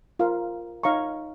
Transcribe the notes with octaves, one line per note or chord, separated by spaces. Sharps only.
F4 A#4 F5
D#4 C#5 F5 A#5 C#6